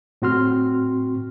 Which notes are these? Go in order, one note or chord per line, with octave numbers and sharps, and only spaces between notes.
A2 C4 F#4 C6 F6